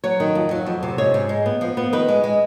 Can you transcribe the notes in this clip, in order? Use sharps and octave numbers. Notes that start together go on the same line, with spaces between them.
F#3 C#5
D#3
F2
F#3
F2
C3
G#2 C#5
G#2
G#3
B3
F3
B3
D#3 B4
G#3
G#3